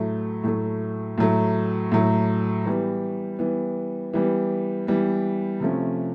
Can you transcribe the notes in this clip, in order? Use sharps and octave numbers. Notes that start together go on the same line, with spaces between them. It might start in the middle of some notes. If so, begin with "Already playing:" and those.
Already playing: A2 F#3 A3
A2 F#3 A3
A2 F#3 A3
A2 F#3 A3
E3 G3 B3
E3 G3 B3
E3 G3 B3
E3 G3 B3
C3 F3 A3 C#4